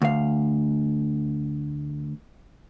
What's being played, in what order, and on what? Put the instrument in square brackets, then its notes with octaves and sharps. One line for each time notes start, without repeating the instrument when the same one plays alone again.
[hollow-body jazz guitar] D2 F5